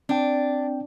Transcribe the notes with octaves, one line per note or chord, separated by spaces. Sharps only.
C4 D4 G5